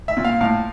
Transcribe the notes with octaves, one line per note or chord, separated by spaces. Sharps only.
E5
A#2
F5
A2 F5